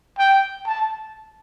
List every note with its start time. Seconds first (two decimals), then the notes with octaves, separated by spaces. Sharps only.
0.19 G5
0.66 A5